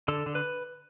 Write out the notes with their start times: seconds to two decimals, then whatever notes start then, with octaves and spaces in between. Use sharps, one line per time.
0.08 D3 A4
0.26 D3
0.35 B4